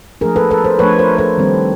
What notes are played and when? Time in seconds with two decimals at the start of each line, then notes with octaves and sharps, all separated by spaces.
0.21 F3 A3 D4 G#4 A#4
0.36 A4 B4
0.51 A4 B4
0.64 A#4 C5
0.79 F3 A3 D4 B4 C#5
0.99 A#4 C5
1.18 A4 B4
1.38 D#3 G3 C4